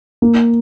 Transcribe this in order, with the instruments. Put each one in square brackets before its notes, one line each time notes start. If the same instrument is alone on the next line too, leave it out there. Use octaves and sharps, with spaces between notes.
[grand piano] A#3